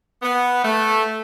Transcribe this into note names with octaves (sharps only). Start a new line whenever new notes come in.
B3
A3